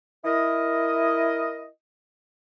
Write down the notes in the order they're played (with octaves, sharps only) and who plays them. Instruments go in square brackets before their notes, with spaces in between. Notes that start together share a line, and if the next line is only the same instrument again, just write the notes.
[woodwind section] E4 A#4 D#5